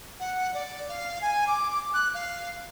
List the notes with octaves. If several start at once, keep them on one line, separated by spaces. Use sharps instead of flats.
F#5
D5
F5
G#5
D6
F#6
F5